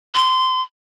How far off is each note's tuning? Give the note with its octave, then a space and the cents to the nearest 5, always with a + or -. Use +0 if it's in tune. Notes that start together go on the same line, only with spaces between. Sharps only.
C6 -25